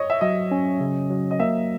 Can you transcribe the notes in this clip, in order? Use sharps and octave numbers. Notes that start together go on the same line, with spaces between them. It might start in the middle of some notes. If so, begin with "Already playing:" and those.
Already playing: C#5 D#5
E5
F#3 D#5
C#4
C#3
F#3
D#5
A#3 E5